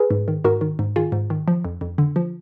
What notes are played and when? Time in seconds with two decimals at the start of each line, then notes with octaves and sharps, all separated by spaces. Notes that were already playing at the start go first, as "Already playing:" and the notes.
Already playing: G#4 B4
0.11 G#2
0.28 D#3
0.44 G#2 F#4 A#4
0.61 D#3
0.79 G#2
0.96 D#3 F4 G#4
1.12 G#2
1.30 D#3
1.48 F3
1.65 F2
1.81 F2
1.98 D3
2.16 F3